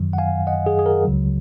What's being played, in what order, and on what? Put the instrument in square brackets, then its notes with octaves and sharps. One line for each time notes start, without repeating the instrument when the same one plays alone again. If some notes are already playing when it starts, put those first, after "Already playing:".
Already playing: [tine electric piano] F#2 D#3 F#3
F#5
F5 G#5
D#5 F#5
G#4
G#4
A#4
C#2 C#3 F#3